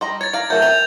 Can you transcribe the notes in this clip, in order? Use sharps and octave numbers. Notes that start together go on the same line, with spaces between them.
G3 D#5 A#5 C6
C#5 G#6 A6
D5 F5 A#5 A6
F#3 A3 G#4 A#4 E5 A#5 G6
C5 E5 G5 F7